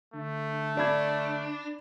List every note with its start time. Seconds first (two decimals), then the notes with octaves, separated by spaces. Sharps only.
0.14 D3 A3
0.77 D3 D4 D5 B5 G#6